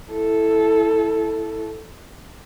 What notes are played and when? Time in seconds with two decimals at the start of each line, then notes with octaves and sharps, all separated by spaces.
0.12 E4 A4